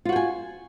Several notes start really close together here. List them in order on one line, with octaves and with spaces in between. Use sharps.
F4 F#4 G5 G#5